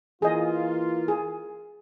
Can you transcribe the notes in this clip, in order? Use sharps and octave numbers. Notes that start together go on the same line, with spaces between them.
E3 A#3 F4 G#4 D#5
G#4